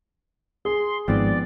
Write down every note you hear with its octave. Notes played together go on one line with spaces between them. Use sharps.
G#4 C6
G#1 G#2 F3 B3 C4 D5